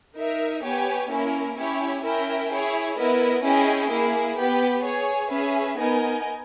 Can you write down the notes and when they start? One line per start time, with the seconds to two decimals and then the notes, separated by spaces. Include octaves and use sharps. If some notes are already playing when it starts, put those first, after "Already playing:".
0.17 D#4 A#4 E5
0.64 B3 G4 C#5 G#5
1.10 A#3 C#4 E4 A#4
1.57 C#4 E4 G4 C#5
2.04 C#4 E4 A#4 E5 G5
2.51 E4 G#4 C#5
2.97 B3 E4 A#4 D#5
3.44 C#4 E4 G#4 D#5 G5
3.91 A#3 E4 G#4
4.38 B3 G4 B4
4.84 G#4 C#5 G#5
5.32 C#4 G#4 B4 E5
5.78 B3 D#4 A#4 D#5 G#5